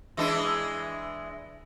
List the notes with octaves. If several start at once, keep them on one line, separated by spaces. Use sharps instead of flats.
E3 G#3 D4